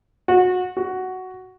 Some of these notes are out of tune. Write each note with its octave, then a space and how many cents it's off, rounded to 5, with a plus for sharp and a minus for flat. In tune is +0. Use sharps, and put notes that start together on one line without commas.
F#4 -25
F#4 +5